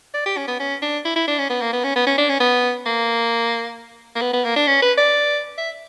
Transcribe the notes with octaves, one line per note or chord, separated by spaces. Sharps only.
D5
G4
C#4
B3
C#4
D4
E4
E4
D4
C#4
B3
A#3
B3
C#4
B3
C#4
D4
C#4
B3
A#3
A#3
B3
B3
A#3
D4
C#4
B4
D5
E5